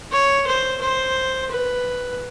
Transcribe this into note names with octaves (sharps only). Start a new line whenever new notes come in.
C#5
C5
C5
B4